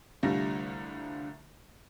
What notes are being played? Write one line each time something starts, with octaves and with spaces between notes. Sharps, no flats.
C2 D3 G3 A3 F4 A#6